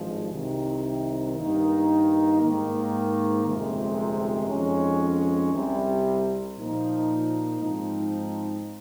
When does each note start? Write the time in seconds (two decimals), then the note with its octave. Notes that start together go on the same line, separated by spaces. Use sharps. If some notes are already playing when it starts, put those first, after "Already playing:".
Already playing: G#1 G2 F3 G#3
0.33 C2 C3 D#3
1.37 G2 D#3 A#3 D#4
2.41 G#2 D#3 A#3
3.45 G1 F2 C3 D#3 G#3
4.49 F2 D#3 G#3 C#4
5.53 C2 C3 G3
6.58 A#2 F3 A#3 D#4
7.62 G#2 F3 C4 D#4